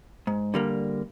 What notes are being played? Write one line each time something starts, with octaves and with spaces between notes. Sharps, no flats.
G#2
D3 G3 A#3